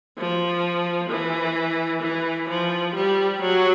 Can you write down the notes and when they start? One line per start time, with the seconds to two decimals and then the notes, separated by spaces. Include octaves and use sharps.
0.17 F3
1.09 E3
2.02 E3
2.49 F3
2.95 G3
3.41 F#3